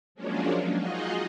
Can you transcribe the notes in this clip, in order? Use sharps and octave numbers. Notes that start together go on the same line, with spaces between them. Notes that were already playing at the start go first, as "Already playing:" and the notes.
F3 F#3 G#3 A#3 C#4 D4
D#4 F4 F#4 G#4 D#5